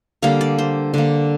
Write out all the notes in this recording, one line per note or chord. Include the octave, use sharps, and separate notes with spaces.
D3 G3 A#3 F5
D5
C5
D3 A#3